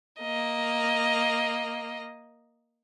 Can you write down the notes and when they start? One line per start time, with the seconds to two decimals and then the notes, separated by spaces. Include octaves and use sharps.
0.20 A#3 D#5